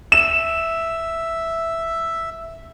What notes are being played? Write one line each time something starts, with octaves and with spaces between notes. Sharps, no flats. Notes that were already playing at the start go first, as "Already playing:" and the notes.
E5 E7